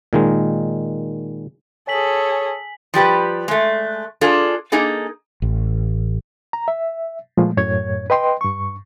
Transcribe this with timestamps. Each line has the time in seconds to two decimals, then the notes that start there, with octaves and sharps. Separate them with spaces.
0.13 A#2 D#3 G#3
1.88 G#4 A4 C#5 G#5 B6 F#7
2.94 F3 G3 G4 B4
3.48 G#3 A3
4.21 D4 F4 G#4 A4
4.72 A#3 D#4 G#4 A4
5.42 A1
6.53 A#5
6.68 E5
7.37 A#2 F3 G#3 A3
7.57 F#2 A2 C#5 G#6
8.10 B4 D#5 G5 C6
8.41 G2 C#6